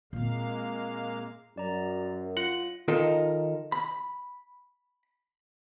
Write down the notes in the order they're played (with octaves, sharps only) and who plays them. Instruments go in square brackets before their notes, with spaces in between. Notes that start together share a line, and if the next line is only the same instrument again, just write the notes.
[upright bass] A#2 C4 [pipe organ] G#3 A#3 F5
[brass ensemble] F#2 [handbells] D5 A#5
[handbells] F4 [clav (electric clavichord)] F#5
[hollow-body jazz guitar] D#3 F4 A4 A#4 D#5
B5